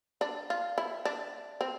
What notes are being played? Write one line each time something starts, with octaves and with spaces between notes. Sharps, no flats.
D4
F4
E4
D4
C4